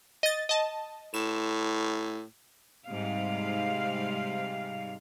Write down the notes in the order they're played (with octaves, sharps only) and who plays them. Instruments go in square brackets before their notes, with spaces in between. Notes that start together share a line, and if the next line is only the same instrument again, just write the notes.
[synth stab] D#5 A6
D#5 A5
[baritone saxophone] A2 [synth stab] E7
[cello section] G#2 C3 G3 F5